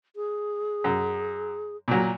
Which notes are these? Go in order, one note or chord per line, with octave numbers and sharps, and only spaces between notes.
G#4
F#2
A#2 F#3